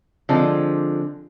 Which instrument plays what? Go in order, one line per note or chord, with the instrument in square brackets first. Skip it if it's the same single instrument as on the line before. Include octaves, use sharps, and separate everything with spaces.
[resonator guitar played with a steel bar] D3 F3 G#3 C4